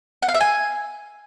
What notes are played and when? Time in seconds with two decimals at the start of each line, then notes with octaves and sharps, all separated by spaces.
0.22 F#5
0.28 F5
0.34 E5
0.40 G#5